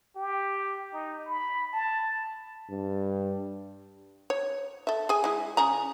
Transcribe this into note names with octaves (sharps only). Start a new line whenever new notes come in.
G4
D#4
B5
A5
G2
C#5
A4 E5
G#4 G#5
G#3 E4
C#3 G#4 A#5